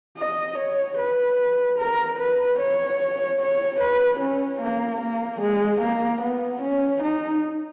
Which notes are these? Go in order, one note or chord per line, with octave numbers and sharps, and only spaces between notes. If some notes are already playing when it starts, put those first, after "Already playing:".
D#5
C#5
B4
A#4
B4
C#5
C#5
B4
C#4
A#3
A#3
G#3
A#3
B3
C#4
D#4